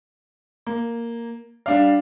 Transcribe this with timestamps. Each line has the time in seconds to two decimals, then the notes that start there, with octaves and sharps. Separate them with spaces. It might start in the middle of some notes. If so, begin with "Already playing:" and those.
0.67 A#3
1.66 G3 D4 F5